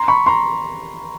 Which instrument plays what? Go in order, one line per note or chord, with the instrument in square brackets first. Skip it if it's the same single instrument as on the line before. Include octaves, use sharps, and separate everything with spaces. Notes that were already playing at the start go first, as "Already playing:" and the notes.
Already playing: [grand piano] A#5 C6
B5 C#6
A#5 C6